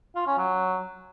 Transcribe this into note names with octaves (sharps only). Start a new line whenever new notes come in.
F4
C#4
F#3